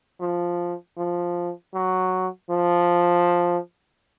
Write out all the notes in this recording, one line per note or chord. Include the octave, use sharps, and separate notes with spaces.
F3
F3
F#3
F3